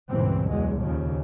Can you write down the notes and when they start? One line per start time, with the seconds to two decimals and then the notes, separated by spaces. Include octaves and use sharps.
0.11 C#2 G2 A#2 E3 C4
0.50 E2 F#3 G#3
0.80 D#2 A#2 C#3 F3